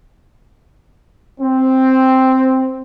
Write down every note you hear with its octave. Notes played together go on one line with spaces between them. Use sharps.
C4